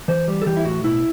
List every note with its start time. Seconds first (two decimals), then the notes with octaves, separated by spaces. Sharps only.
0.08 E3 C5
0.28 G3
0.42 A4
0.46 E3 G4
0.57 E4
0.65 A2 F#4
0.84 B2 E4